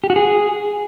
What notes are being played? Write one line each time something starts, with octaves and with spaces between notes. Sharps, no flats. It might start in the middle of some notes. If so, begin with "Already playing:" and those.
G4
F#4
G#4